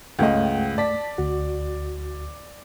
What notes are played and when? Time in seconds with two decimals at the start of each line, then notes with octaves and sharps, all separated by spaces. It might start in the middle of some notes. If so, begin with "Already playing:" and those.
0.19 C#2 G2 A3 D#5 F#5 G5
0.78 D5 A5 B6
1.18 D2 F#4